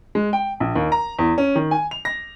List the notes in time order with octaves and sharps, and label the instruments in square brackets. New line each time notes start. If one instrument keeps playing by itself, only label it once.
[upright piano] G#3
G5
A#1
D#2
A#5
E2
C#4
D#3
G#5
F7
A#6